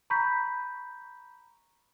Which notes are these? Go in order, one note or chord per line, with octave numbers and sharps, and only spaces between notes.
A#5 B5 C#6 G6 B6